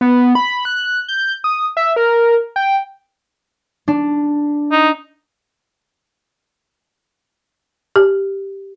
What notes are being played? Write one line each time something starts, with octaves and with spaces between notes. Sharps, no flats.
B3
B5
F#6
G6
D#6
E5
A#4
G5
D4
D#4
G4